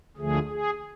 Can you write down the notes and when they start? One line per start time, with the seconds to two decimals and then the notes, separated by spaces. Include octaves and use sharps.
0.17 D2 D3 F3 A3 G#4
0.49 G#4